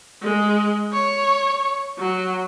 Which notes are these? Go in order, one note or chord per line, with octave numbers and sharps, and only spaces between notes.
G#3
C#5
F#3